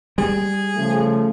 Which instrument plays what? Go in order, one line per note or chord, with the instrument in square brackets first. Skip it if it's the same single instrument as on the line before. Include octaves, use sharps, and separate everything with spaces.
[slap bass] G3 [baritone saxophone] G#4
[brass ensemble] C#3 F3 A3